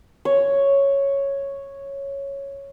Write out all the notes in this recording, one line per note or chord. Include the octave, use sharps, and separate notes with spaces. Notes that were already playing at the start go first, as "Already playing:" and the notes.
C#5